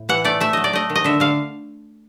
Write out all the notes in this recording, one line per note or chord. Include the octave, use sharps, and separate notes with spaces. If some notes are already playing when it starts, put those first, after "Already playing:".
Already playing: A2
E3 F#5
A3 D5
A3 E5
F#3 D#5
D5
A3 D#5
D#3
D#5
D3 E5
D3 F5